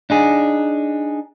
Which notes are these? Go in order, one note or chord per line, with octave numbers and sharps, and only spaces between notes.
D4 D#4 G#4